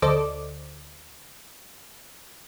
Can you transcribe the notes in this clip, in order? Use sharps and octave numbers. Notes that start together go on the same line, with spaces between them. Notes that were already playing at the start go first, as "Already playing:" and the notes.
D2 A4 C5 D5 D#5 D6